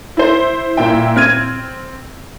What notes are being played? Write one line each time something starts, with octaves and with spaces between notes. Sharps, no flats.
E4 C5
A#2 E4 G5
C4 F6 G#6 D#7